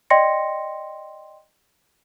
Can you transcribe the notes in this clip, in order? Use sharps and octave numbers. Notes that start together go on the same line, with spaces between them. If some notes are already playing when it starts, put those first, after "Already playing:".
D5 D#5 G5 C6 A#6 C#7